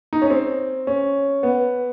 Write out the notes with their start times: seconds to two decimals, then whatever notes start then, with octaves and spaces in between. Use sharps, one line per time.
0.13 D#4
0.22 C#4
0.30 C4
0.87 C#4
1.43 B3